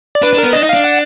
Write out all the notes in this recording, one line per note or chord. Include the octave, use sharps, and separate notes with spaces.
D5
D4 B4
D4
B3 A#4
D4 D#5
D#4
D4 F5
F#5